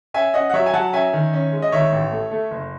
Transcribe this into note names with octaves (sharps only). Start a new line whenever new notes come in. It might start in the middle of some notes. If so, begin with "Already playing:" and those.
C#4 E5 G#5
C#4 D#5 F#5
F#5
F#3 C#5 E5
G#5
F#3 F#5 A5
C#4 E5 G#5
D#3
C#4
G#3
D#5
D#3 C#5 E5
A1
A3
A3
F#1